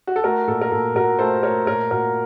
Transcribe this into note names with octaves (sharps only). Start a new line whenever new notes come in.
F#4
A4
A3 F#4 A#4
A#2 A4
A#4
A#2 A4
A#2 F#4 A#4
A3 A4 C5
A3 A#4 C#5
A#2 A#4 C#5
A#2 F#4 A#4